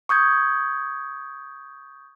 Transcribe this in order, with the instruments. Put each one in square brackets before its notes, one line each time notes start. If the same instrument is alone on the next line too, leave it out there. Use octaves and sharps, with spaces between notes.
[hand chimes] C#6 D#6 G6 G#6